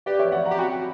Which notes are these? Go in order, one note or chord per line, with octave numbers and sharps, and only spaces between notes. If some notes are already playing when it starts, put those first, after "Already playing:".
G4 B4 D5
C#5 E5
D5 F#5
F#5 A#5
G4
F#4 G5 B5